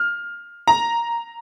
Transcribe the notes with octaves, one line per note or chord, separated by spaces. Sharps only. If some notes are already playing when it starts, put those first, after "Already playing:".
Already playing: F6
A#5